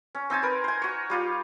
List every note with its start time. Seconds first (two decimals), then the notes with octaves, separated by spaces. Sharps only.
0.15 C#4
0.30 C4 D#4 G#5 A5
0.43 A#4 B4
0.64 C5 G#5
0.82 F#4 C#5
1.10 G3 F4 G4